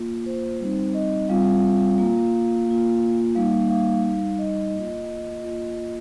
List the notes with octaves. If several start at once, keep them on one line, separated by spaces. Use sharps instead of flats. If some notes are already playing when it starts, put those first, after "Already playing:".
Already playing: A#3 F4
C5
G3 C4 D#4 C5
D#5
G3 C4 F4 F5
A#3 F4
A#3 F4
G3 A#3 D#4 F5
F5
G3 D#4 F5
D#5
A#3 F4
A#3 F4